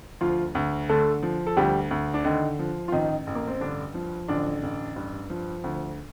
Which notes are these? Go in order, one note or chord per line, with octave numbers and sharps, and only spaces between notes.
D2 F3 F4
D2
D3 A3 A4
F3
A4
D2 G3 G4
D2
D4
D3 D#3 D#4
F3
F4
A1 D#3 D#4
A1
A#3
C4
G2 D3 D4
F3
A1 D3 D4
A1
G2
F3
D2